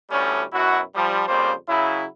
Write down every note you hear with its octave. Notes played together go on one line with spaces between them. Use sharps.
D2 A2 G3 A3 C#4
F#2 B2 E4 F#4
F3 G3
F2 C#3 G3 A#3 C5
C#3 F#3 E4